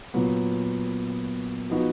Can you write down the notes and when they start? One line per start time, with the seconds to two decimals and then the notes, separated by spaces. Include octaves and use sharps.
0.14 A#2 F#3 B3
1.70 F3 B3 D#4 F#4